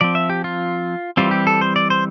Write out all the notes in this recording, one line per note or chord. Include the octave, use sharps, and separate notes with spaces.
F3 C4 D5
E5
G4
F4
E3 G3 C4 F4
G4
A4
C5
D5
C5